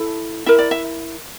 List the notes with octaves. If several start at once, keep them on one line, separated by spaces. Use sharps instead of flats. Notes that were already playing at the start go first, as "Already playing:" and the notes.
Already playing: E4 A4
E4 A#4 E5
D5
E5